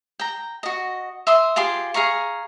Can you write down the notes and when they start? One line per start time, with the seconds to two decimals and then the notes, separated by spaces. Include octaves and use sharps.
0.20 G5 A#5
0.63 F#4 D#5
1.27 E5 C6 D#6
1.56 F4 G4 G#4 C6
1.94 G#4 F5 A#5 C#6